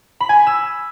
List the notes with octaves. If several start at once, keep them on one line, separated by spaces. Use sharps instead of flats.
B5
G#5
B6
E6